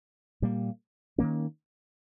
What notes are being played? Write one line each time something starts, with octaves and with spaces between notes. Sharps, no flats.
A#2 G3 A#3
D#3 F#3 A#3 C#4